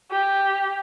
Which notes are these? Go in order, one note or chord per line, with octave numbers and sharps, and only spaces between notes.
G4